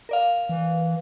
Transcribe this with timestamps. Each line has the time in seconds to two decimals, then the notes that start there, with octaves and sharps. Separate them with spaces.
0.09 A#4 D5 F5
0.49 E3